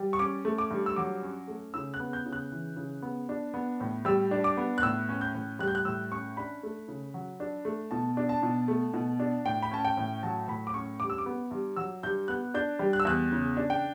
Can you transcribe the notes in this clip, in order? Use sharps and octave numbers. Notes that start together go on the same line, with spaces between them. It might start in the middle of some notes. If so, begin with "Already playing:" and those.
Already playing: G3
C#6
C#4 D6
A3
D6
G2
E6
F#3 D6
C#4
A3
C#3 E6
F#6
B3
G6
C#3
F#6
E3
C#3
B3
D4
B3
A2
G3 E6
D4
D6
B3
F#6
A2 E6
C#4
G6
A2
G3 F#6
G6
F#6
A2 E6
C#4 C#6
D4 B5
A3
C#3
F#3
D4
A3
B2 A5
D4
A5
B2
A3
B2
D4
A2 G5
B5
C#4 A5
G5
A2
F#3 A5
A2 B5
D6
C#4 C#6
G2 D6
E6
D6
B3
G2
F#3 E6
G2 G6
B3 F#6
D4 G6
G3
F#6
E6
E2 F#6
C#3
D4
G5